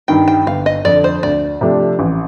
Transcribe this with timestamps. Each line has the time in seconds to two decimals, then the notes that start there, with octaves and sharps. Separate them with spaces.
0.08 G2 D#3 G5
0.28 G5
0.47 G1 F5
0.66 D#5
0.85 F2 D3 D5
1.04 C5
1.23 D2 D5
1.61 C3 F3 A3 D4
1.99 A1